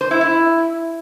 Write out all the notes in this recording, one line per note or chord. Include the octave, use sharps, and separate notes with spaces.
C5
E4
E4